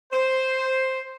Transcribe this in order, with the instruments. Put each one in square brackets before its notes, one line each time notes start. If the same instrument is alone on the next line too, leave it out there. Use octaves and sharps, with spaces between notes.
[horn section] C5